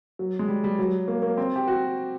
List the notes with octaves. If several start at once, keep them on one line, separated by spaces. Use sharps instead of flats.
F#3
G#3
G3
G3
F#3
A#3
A#3
C4
G4
F#4